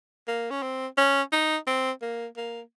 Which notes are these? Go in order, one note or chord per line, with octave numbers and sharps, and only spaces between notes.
A#3
C#4
C4
C#4
D#4
C4
A#3
A#3